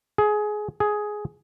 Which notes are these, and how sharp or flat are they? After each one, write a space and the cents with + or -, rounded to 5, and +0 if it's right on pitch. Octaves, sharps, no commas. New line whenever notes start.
G#4 +20
G#4 +10